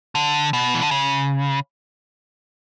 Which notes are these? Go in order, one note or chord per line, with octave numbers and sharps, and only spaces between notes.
D3
B2
E3
D3
C#3